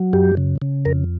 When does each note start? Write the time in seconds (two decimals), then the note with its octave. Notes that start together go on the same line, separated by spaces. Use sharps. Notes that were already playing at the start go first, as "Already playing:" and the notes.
Already playing: F#3
0.13 F#2 G4
0.37 C#3
0.62 C#3
0.85 F2 A#4